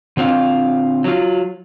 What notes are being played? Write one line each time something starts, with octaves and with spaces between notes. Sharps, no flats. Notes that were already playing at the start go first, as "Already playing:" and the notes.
D3 C4 F4 F5
F#3 F4